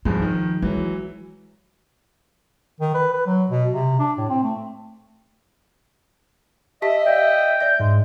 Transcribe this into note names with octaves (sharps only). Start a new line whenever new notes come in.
G#1 G2 F3 G#3
D#3
E3 F#3 G#3
D#3
B4
B4
F#3
B2
C3
D4
A2
C4
A3
G4 D#5 E5 A5 B6
D5 F5 G5
D5 E5 G6
G#2 G#3